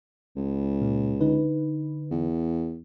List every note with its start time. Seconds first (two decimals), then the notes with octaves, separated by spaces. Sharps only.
0.36 C#2
0.82 A#2
1.21 D3 D#4 B4
2.11 E2